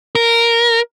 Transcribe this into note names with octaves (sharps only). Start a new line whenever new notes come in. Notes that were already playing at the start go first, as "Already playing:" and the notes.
A#4